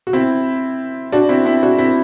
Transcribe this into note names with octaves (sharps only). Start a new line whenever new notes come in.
F#4
C4 E4
D4 F#4
C4 E4
C4 E4
D4 F#4
C4 E4